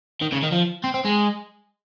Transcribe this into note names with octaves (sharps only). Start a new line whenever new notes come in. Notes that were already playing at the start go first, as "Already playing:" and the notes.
D#3
C#3
D#3
F3
C4
C4
G#3